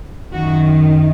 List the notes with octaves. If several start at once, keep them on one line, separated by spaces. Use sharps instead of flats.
F#2 D#3 F#4